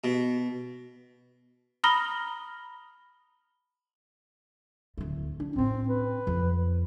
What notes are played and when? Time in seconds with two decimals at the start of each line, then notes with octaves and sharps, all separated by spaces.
0.04 B2
1.84 A#5 B5 D#6 F6 A#6 G7
4.98 D1 A3
5.40 D4
5.56 A2 C4 C#4
5.88 B4
6.27 F2